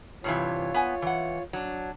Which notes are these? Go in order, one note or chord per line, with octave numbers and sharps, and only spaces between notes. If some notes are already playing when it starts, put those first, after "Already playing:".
G2 C3 E3 F4 C#5
B3 G#5
E3 F#5
F#3 D4